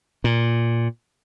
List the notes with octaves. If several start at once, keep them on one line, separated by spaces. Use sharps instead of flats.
A#2